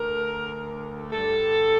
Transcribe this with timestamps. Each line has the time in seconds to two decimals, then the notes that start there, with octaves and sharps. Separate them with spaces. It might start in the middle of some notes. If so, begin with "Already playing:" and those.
Already playing: D2 D3 A3 A#4
1.12 G2 D3 G3 A4